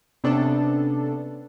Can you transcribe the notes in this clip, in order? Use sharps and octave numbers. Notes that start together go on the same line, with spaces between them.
C3 B3 C#4 D4 A4